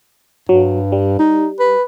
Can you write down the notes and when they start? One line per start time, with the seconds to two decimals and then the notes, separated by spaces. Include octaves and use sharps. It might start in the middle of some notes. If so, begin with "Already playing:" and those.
0.49 G2 F#3
0.92 G3
1.19 D#4
1.59 B4